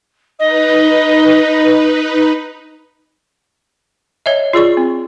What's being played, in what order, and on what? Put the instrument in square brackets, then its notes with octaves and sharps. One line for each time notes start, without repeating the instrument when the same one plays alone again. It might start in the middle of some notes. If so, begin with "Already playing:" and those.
[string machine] D#4 B4 [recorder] D#5
[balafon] C#5 D#5 E5
F4 G#4 D5 C#6
C4